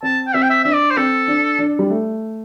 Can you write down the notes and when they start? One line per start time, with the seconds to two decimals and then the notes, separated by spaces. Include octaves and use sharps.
0.03 C4 A5
0.27 G5
0.34 C4 E5
0.42 G5
0.50 E5
0.64 D4 E5
0.73 D5
0.90 C5
0.97 C4 A4
1.28 D4
1.59 D4
1.79 G3
1.90 A3